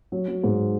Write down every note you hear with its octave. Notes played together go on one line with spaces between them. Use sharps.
F#3
F#3
G#2